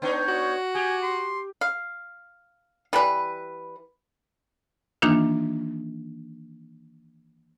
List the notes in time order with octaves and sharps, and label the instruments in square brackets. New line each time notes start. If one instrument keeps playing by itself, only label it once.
[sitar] B3 D4 D#4 [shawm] C#5
[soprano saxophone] F#4
[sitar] G4 [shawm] G#5
[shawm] C6
[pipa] F5
E3 G3 B4
[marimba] D#3 E3 A#3 D4 D#4 F4